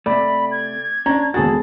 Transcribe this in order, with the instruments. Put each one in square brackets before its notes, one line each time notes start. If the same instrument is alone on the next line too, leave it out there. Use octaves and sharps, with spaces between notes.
[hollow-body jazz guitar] C3 A3 [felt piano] D5 [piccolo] B5
[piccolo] G#6
[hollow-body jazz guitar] C#4 D4 [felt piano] A#5
[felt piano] E1 G#4 A6 [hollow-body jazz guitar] F#4 A4